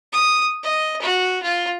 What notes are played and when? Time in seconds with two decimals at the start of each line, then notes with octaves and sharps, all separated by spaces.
0.13 D#6
0.63 D#5
1.02 F#4
1.43 F4